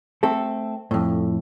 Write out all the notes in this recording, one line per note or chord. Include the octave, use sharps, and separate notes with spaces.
A3 C4 A4
F2 A2